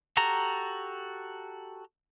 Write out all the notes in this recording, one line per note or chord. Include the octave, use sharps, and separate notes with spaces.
F#4 G4 A4 A#5